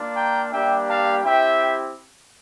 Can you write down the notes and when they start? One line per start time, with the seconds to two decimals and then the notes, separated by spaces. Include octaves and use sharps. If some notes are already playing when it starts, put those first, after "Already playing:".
Already playing: A#3 D4 F4
0.15 G5 A#5
0.51 G3 A#3 D4 G4 E5 G5
0.87 F5 A5
1.24 C4 E4 G4 E5 G5